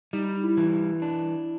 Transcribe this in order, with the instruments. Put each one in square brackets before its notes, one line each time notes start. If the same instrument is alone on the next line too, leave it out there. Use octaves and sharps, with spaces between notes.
[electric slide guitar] G3 [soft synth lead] D#4
[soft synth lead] E4
[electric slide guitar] E3
[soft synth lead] E4
[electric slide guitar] D4